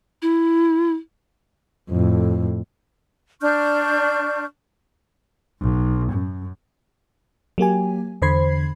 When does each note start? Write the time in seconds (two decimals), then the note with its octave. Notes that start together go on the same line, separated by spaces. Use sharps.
0.22 E4
1.90 F2 A2
3.41 D4 C#6 F6 G6
5.61 B1
6.12 F#2
7.58 F#3 A#3 G4 G#5
8.22 E2 D3 C5 B5 G#6 C7